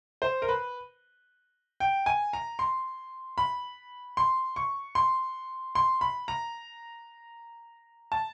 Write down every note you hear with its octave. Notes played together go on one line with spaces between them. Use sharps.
C5
A#4
B4
G5
G#5
A#5
C6
B5
C6
C#6
C6
C6
B5
A#5
A5